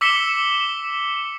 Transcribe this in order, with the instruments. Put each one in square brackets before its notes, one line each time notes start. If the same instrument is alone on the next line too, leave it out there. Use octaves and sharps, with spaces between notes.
[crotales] D6 E6 B6 C#7 E7 G7